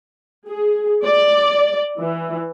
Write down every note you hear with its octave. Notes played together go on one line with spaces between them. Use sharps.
G#4
D5
E3